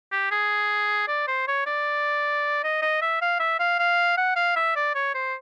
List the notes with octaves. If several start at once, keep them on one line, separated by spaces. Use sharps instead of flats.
G4
G#4
D5
C5
C#5
D5
D#5
D#5
E5
F5
E5
F5
F5
F#5
F5
E5
D5
C#5
C5